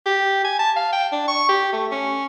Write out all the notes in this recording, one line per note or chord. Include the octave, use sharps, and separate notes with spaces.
G4
G#5
A5
F5
G5
D4
C#6
G4
A3
C#4